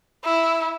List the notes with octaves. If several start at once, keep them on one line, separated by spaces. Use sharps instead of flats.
E4